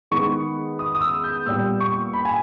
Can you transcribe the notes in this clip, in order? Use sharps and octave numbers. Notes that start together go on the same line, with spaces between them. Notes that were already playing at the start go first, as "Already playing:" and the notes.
D#3 G#3 B3 C#6
D#6
D#6
E6
G6
A#2 G3 B3 E6
C#6
B5
G#5